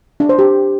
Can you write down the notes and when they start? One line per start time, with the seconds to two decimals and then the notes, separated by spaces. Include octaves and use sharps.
0.20 D4
0.29 C5
0.39 G4